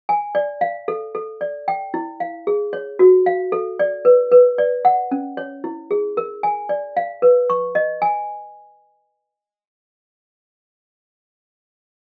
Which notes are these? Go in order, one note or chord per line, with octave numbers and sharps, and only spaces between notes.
G#5
D5
F5
A4
A4
D5
G5
E4
F5
G#4
C#5
F#4
F5
A4
D5
B4
B4
D5
F#5
C#4
C#5
E4
G#4
A#4
G#5
D5
F5
B4
C#6
D#5
G#5